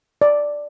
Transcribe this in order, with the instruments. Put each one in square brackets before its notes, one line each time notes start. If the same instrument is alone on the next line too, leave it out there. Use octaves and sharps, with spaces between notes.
[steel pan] D5